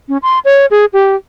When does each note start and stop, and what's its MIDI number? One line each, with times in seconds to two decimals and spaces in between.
0.09 0.18 61
0.22 0.39 84
0.45 0.66 73
0.71 0.85 68
0.93 1.15 67